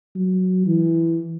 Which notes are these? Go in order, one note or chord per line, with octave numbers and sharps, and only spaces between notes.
F#3
E3